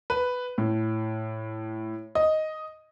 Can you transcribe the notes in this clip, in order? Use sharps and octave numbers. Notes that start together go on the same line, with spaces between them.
B4
A2
D#5